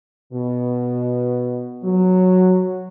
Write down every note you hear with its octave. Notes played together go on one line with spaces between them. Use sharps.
B2
F#3